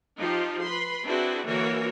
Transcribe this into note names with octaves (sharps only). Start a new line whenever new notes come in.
F3 D#4 F4 G4
B4 B5 C6
C4 D4 E4 F#4 G#4 B4
D3 E3 A#3 F#4 A#4 C#5